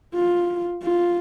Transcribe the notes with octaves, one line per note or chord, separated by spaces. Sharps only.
F4
F4